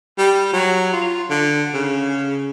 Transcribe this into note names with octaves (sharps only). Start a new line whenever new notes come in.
G3
F#3
F4
D3
C#3